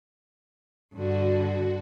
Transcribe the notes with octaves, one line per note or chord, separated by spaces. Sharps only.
G2 D3 F#4